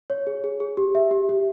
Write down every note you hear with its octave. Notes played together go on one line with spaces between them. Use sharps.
C#5
G#4
G#4
G#4
G4
E5
G4
G4